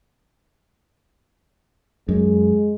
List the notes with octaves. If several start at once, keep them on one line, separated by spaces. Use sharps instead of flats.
F#2 G#3